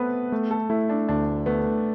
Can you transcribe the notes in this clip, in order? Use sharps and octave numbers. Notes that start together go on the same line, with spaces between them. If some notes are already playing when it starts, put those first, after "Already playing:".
Already playing: A3 B3 C4 A4 B4
A3
A4
A3 E4
D4
D2 D4
A3 B3